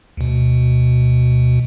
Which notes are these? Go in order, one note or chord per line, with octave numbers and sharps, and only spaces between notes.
D2 B2